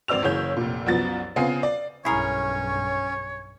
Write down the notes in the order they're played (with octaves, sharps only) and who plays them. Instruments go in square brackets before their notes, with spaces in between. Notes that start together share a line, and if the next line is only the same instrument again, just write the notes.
[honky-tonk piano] G#1 C4 D5 E6 F7
F#1 E3 G#4 C#5 G6
F1 A#2
C2 F#2 F3 B3 A6
C#3 B3 C4 F4 G#5 C7
D5
[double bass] B1 G2 [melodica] C#4 [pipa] E4 G#4 A#4 [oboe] C#5